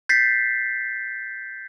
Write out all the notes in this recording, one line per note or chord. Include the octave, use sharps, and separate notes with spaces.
G6 A6 B6 C7